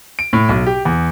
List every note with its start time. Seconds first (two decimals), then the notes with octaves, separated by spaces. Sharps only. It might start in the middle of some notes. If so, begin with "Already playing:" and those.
0.19 D7
0.33 A2
0.49 B1
0.66 G4
0.85 E2